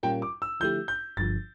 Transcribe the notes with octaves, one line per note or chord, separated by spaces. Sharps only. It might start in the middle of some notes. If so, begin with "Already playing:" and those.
A#2 G3 C#4 F4 A#4 G5
D6
E6
D3 F3 A3 E4 G4 G6
G6
G1 G2 D3 F3 A6